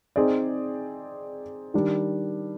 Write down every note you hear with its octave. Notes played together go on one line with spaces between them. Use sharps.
C4 D#4 G#4 D5
D#3 G3 D4